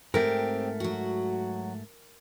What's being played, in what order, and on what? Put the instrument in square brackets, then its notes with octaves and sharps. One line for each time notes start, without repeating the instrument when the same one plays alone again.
[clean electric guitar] G#2 A3 [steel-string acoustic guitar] C4 G4 [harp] A#4
[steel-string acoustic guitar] F#3 F#4